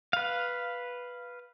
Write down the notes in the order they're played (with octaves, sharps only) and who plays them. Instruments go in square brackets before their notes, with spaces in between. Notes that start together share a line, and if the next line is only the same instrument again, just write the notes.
[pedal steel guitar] B4 F5